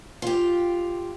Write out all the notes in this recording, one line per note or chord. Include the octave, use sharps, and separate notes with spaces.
F4 G4